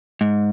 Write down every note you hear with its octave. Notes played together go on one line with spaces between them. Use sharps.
G#2